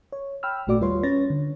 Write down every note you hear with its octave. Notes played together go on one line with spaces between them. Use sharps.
C#5
G5 B5 E6 F6
G#1 A#2 A3 F#4 D5 D6
D#2 G3 F4 B4 C#5 C6
C#4 B4 C#5 A6 A#6
D3